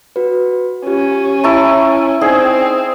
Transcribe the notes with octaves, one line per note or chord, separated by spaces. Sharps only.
F#4 B4
C#4 F4 G4
E4 A5 A#5 C#6 D7
C4 D#4 G#4 D5 G#6